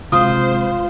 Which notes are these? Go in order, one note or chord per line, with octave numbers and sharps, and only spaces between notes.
C3 G#3 F4 C5 D#6